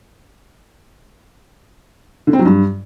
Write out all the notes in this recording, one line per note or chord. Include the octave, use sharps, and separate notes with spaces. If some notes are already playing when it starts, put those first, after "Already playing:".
D3
C4
F#3
G2